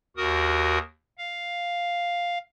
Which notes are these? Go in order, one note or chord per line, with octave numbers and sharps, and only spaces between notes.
D#2 F#4 A#4 D#6
F5